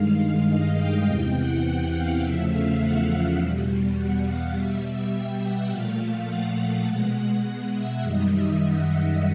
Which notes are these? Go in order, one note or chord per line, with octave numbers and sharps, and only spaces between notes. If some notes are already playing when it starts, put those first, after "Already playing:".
Already playing: G2 D#3 G#3 F5
D#5
G5
E2 C3 E3 G5
F#5
F#5
F5
E2 C#3 F3 A3 E5
F5
F#5
E2 B2 G3
F#5
F5
B2 G3 E5
G5
F#5
A#2 F3 A3 F5
F#5
F#5
B2 G#3
F#5
E5
F#2 D#3 G3 D#5
E5
F#5